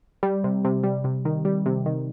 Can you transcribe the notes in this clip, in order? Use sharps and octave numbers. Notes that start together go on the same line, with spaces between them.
G3
C3
C3
G3
C3
D#3
G3
C3
D#3